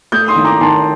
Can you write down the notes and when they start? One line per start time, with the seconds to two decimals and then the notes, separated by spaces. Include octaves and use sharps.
0.12 A3 D#6 G6
0.28 C6 D#6
0.36 D#3
0.45 A#5 D6
0.61 D#3 A5 C6